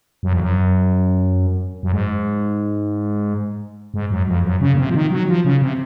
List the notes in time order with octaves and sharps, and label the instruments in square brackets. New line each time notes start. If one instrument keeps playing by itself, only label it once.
[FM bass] F#2
F2
F#2
F#2
G#2
G#2
F#2
F2
F#2
C#3
A#2
C3
F3
D#3
F#3
F3
C#3
C3